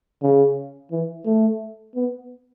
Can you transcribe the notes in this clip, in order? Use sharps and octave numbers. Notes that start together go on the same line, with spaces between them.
C#3
E3
A3
B3